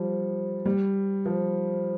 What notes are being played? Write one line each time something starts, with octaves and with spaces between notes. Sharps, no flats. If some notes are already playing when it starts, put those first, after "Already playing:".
Already playing: F3 G3
G3
F3